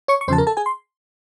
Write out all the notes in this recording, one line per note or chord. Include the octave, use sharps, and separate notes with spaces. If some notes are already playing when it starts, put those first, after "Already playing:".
C#5 C#6
C#6
E2 C#3 F3 C5 A5 C6
A#4 A#5
A4 A5
G#4 G#5
C6